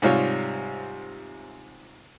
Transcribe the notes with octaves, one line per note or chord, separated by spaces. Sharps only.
G#2 C3 G3 F4 C#5